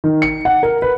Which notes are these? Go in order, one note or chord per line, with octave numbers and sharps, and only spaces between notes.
D#3
C#7
F#5
A#4
B4